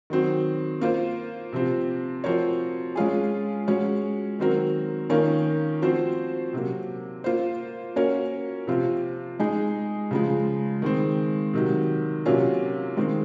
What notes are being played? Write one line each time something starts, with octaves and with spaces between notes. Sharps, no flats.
D#3 F#3 C4 F#4
A#3 F4 C5
C3 F3 C4
F3 C4 F#4 A#4 C#5
G#3 C#4 F4 G#4
G#3 C#4 F#4 C#5
D#3 F#3 C4 F#4 A#4
D#3 A#3 C#4 F4 A#4
F3 C4 F#4 C5
C3 F#3 A#3
A#3 F4 C5
A#3 C#4 F#4 A#4 C#5
C3 F3 C4 F4
G#3 D#4 G#4
C#3 F3 G#3
D#3 G#3 C4
C3 D#3 F#3
C3 F#3 A#3 C#4 F4
D#3 G#3 C4